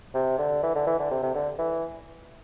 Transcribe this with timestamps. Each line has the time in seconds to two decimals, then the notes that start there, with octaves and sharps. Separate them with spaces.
0.14 C3
0.38 D3
0.63 E3
0.75 D3
0.86 E3
0.99 D3
1.11 C3
1.23 C3
1.35 D3
1.58 E3